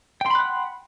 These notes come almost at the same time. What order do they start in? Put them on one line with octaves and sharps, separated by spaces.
G5 C6 B5 F#6 F#5